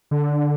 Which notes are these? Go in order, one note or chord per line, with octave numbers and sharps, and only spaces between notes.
D3